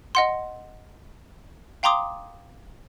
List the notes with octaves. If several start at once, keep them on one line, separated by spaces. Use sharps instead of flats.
D#5 F#5 C6
F5 G5 A#5 C6 D6 D#6